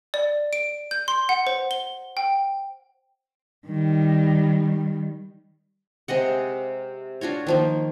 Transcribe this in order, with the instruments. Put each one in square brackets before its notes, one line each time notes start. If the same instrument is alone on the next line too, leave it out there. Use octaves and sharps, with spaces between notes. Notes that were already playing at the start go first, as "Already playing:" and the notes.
[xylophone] D5
D7
G6
C6
F#5
C5
G7
G5
[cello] D#3 G3
[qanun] C3 G#3 D#5 F#5
D4 F4 F#4 C#5
D#3 F3 A#3